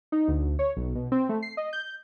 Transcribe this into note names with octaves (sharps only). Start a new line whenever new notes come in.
D#4
D2
C#5
B1
B2
C4
A3
C7
D#5
G6